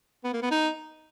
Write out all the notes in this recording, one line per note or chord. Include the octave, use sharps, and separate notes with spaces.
B3
A#3
B3
D#4